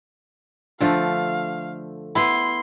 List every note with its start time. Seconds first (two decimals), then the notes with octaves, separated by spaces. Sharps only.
0.80 D3 F3 A3 F5
2.15 B3 E4 C6